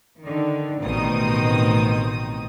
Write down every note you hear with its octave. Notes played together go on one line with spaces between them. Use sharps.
D3 D#3
A1 B2 D#3 C4 D#4 D#6